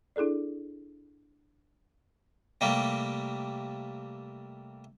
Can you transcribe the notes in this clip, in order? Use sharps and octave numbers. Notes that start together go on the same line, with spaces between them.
D4 E4 G#4 A4 D5
C3 G3 A3 A#3